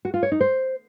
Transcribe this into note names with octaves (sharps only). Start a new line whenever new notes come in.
F#4
F4
C#5
D#4
C5